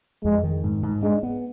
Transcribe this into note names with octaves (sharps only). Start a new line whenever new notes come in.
F2 G#3
D#3
G#2
G#2
G#3 D4
B3